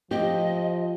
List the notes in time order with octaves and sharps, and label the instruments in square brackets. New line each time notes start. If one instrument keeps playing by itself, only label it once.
[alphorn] F3 [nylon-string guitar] G4 [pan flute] D#5